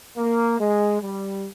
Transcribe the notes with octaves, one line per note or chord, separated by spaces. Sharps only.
A#3
G#3
G3